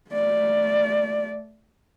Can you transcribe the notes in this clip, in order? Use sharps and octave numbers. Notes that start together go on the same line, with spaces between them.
A3 D5